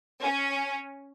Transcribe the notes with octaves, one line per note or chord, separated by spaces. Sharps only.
C#4